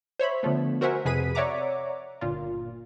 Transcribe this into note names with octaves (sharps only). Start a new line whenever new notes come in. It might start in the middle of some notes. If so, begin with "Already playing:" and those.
C5 C#5 E5 B5
D3 F3 A3 B3
F#4 A#4 C5 E5 F#5 G#5
F2 C3 G#4 B4 B6 D#7
C#5 D5 E5 F#5 A#5 D6
G1 A#2 F4